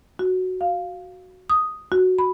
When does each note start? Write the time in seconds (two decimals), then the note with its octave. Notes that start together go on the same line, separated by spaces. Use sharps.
0.19 F#4
0.61 F5
1.50 D#6
1.92 F#4
2.19 B5